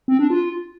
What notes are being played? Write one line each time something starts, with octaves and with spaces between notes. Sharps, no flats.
C4
D4
F4